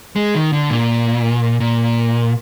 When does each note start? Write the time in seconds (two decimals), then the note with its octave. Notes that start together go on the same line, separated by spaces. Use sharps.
0.16 G#3
0.35 D#3
0.53 D3
0.70 A#2
1.60 A#2